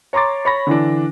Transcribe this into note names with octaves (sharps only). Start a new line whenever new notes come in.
C#5 A#5 C6 D6 A6
C#5 B5 A#6
D3 E3 D4